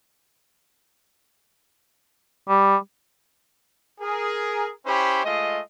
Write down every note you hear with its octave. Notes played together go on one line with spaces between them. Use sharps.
G3
G#4 A#4
C#4 E4 G4 C5 C#5 B5
G#3 A3 F4 D#5